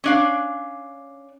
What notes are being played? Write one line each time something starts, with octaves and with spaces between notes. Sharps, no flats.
C#4 D4 F5